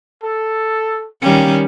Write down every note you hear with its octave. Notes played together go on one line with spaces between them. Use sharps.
A4
D#3 G3 A#3 C#4 G5